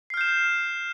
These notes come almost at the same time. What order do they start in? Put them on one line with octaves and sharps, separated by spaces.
C7 F6 G6 E7